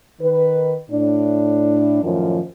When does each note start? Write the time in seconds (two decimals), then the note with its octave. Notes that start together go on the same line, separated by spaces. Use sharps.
0.21 D#3 B4
0.90 A2 D4
2.03 F#2 A2 D#3 F3